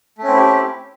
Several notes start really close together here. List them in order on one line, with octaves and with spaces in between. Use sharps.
A3 C#4 C4 E4 G4